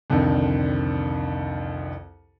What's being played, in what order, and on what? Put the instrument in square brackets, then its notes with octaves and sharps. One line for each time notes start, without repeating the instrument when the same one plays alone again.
[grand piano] C2 F2 D3 D#3